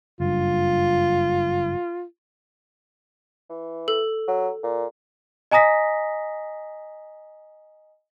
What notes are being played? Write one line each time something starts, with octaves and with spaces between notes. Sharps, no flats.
F#1 G2 F4
E3
A4
F#3
A#2
D#5 G#5 A#5 D#6 A#6 B6